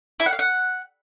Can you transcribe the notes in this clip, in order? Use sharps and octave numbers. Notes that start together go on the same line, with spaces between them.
E4
F#5
F5
F#5